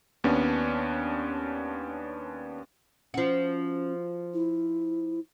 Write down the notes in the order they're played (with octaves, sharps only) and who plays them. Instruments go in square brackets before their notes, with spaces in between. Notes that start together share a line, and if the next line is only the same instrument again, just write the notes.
[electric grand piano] D#2 B3 C#4 D4
[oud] F3 F#4 [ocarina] C#4
[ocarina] E4